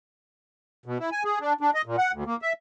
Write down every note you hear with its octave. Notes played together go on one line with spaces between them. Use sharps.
B2
E4
G#5
G#4
D4
D4
D#5
A#2
F#5
D2
A#3
E5